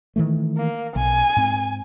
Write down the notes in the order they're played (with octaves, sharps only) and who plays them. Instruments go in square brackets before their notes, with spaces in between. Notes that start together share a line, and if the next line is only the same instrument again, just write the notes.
[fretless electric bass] D#3 E3 A3
[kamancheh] A#3
[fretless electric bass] B1 [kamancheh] G#5
[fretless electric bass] G#2 C4